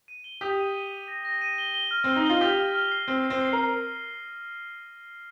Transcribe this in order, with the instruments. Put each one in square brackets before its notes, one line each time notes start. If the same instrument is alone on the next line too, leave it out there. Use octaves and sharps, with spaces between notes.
[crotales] D#7
G7
[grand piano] G4 [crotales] D#6
[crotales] D#7
D#7
D#7
A#6
A#6
D#7
G7
G7
F6
[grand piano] C4 [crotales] G7
[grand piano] D#4
[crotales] G7
[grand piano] F4
[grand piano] G4 [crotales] G7
[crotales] F6
F6
C7
[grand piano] C4 [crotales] F6
[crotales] C7
[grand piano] C4
[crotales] C7
[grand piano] A#4 [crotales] C7